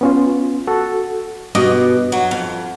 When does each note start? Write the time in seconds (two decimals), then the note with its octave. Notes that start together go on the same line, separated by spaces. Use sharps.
0.01 B3 C#4 F4
0.67 F#4 A4
1.55 G2 B2 D#5 D6
2.12 F#3
2.31 F2